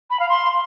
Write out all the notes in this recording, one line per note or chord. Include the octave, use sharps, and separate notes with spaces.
B5
F5
C6